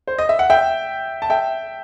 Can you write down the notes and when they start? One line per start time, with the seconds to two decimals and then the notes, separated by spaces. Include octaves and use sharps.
0.08 C5
0.18 D#5
0.29 E5
0.39 F#5
0.50 E5 G5
1.22 A5
1.30 E5 G5